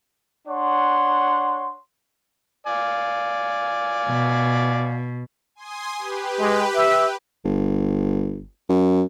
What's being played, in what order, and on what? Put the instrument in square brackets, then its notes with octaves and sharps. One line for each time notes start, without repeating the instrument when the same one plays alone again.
[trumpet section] D4 C#5 F#5 C6
[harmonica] D5 F5 G#5
[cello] B2
[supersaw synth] G#5 C6 D#6
G4 B4
[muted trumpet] G#3
E5
[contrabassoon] G1
F#2